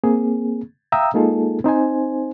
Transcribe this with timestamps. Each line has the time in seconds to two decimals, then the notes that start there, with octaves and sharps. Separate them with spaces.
0.04 A#3 C4 G#4
0.92 E5 F5 G5 A#5 D#6 E6
1.14 G#3 A#3 D#4 F4 G#4 A4
1.64 C4 D#4 C5 G#5